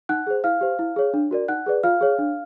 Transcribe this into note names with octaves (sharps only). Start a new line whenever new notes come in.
D#4 F#5 F#6
G#4 C5
E4 F5 F6
G4 C5
E4
G#4 C#5
D4
F#4 A#4 D5
D#4 F#5 F#6
G#4 B4 D5
F4 F5 F6
G#4 C#5
D4